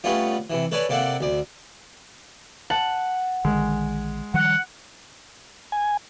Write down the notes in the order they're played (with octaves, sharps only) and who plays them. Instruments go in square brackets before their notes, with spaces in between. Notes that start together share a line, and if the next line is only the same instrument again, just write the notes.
[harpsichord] G3 A3 B3 C#4 F4
C3 E3
A4 B4 C#5 D5 G#5
C3 A#3 A4 D5 F#5
D2 D5
[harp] F#5 [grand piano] A5
[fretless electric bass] A#1 D3 D#3 [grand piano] G#3
[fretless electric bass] D#3 F3 G3 [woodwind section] F#5
[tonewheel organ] G#5